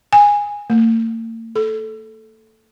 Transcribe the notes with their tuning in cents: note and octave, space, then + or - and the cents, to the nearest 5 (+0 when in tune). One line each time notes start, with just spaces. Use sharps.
G#5 -15
A#3 -45
A4 -10